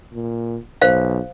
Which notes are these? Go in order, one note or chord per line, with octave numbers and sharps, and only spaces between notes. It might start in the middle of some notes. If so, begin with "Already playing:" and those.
A#2
B1 C5 F5